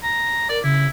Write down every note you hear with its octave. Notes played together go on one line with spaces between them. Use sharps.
A#5
A#4 D5
C#3 E4